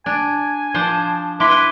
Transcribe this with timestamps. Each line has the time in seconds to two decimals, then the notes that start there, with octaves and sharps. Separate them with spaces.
0.06 D4 G#5
0.74 F3 D4 C5
1.40 E4 B4 C6 D6